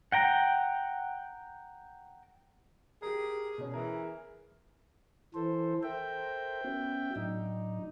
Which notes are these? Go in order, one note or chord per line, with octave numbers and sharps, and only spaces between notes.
F#5 G5 A#5
G4 G#4 A#4
B2 C#4
E3 G#4 A#4
E3 A4 C5
A4 A#4 C5 E5 G5
B3 C#4 F#4
A2 F#3 D4 D#4